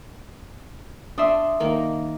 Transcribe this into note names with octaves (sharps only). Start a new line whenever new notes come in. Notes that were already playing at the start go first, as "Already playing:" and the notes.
D4 E5 C6 D#6
D#3 A#3 A#4